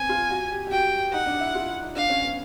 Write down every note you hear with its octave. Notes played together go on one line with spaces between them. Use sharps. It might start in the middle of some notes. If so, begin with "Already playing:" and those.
Already playing: B3 C4 G#5
F4
F#4
G4
G4
F#4 G5
D#4 F#5
D4
E4
F4
E4
D#4
D4 F5
C#4
B3